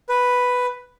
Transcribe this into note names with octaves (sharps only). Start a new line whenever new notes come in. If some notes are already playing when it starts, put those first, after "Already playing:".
B4